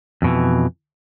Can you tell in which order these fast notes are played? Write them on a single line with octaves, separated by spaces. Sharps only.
F2 B2 E3